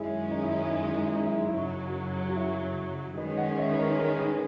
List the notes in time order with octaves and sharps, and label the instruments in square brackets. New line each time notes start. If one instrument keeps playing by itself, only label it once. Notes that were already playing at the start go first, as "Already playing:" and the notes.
Already playing: [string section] F#2 D#3 G#3 C#4 [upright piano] E4 G#4
[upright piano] D#4
E4
D#4
E4
D#4
E4
D#4
E4
D#4
E4
D#4
E4
[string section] F#2 C#3 F#3 [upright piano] D#4
[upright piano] F#4
E4
[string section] D#3 G#3 C#4 [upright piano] B4 D#5
[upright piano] D#5 F#5
C#5 E5
B4
A#4 C#5
A#4 C#5
G#4 B4